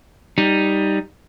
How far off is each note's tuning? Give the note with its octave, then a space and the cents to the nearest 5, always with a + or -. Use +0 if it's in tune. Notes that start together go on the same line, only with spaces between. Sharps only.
G3 +0 D#4 +0